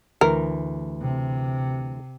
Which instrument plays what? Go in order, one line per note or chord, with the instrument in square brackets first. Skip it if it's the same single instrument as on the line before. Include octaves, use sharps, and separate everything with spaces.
[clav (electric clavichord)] D2 E3 [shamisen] A#4
[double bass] C3